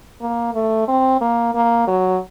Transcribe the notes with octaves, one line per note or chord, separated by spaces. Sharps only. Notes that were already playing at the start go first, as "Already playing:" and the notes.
A#3
A3
C4
A#3
A#3
F#3